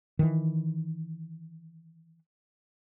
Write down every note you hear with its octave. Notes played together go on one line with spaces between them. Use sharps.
D#3 E3